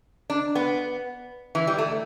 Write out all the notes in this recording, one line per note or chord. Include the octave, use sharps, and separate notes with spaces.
D4
B3
E3
G3
A3